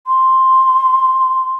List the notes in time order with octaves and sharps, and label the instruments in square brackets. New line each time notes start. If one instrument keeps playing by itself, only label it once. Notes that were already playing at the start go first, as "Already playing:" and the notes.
[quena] C6